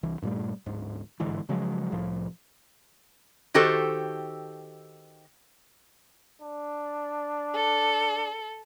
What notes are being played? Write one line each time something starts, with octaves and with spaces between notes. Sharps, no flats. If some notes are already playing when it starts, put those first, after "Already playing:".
C2 E3
G2 A#2 G3 A3
D1 G#2
G1 G#2 D3 E3
C#3 F3 F#3 G#3
C2 A2 F3
D#3 F#4 G4 A4 C5
D4
A4